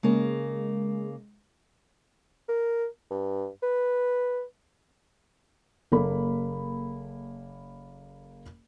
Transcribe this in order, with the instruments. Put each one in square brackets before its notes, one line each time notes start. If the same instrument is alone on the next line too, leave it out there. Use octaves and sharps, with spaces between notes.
[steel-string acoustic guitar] C#3 A#3 [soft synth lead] G#3
[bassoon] A#4
G2
B4
[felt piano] F#1 A#3 A4 B5